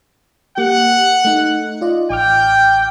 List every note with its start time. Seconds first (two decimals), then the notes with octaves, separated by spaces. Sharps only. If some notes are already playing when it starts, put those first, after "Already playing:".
0.58 A#3 G4 F#5
1.25 A3 D#4
1.81 F4 D5 D#5
2.10 A1 G5 D6 F6